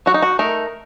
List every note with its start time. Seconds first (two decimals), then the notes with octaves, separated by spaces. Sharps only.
0.06 F#3 F#4
0.14 D#4
0.22 F#4
0.39 A3 D#4 A#4